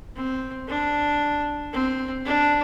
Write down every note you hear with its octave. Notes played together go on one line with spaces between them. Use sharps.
C4
D4
C4
D4